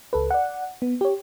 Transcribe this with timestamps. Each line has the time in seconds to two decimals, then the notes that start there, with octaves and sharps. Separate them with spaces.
0.13 C#2 A4 B4
0.30 D5 F#5
0.82 B3
1.01 G4 C#5